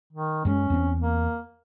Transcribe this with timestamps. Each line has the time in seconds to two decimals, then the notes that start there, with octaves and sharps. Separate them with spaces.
0.13 D#3
0.45 F#2 G#3 C#4
0.70 E2 B3 C4
1.01 A#3